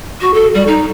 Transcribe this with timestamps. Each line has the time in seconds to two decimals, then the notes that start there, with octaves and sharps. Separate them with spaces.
0.21 F#4
0.34 A4
0.54 G3
0.67 D#4